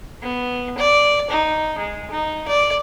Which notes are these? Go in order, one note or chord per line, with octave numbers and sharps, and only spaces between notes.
B3
D5
D#4
G#3
D#4
D5